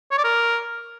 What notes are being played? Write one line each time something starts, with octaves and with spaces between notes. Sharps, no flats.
C#5
D5
A#4